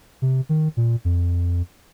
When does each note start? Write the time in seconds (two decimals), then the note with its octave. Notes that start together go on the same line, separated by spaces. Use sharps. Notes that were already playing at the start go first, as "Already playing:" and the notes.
0.22 C3
0.49 D#3
0.77 A#2
1.05 F2